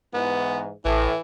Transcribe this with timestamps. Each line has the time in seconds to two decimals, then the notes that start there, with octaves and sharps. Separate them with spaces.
0.14 G#2 E3 B3
0.85 A1 A2 E3